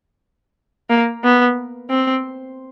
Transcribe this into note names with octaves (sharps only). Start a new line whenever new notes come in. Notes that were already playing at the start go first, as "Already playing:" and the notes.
A#3
B3
C4